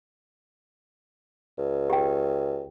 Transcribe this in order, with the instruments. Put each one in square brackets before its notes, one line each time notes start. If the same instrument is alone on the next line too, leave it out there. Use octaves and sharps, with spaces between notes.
[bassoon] C#2
[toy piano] G4 G5